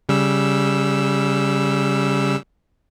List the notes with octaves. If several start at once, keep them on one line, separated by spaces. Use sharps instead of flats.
C#3 G3 E6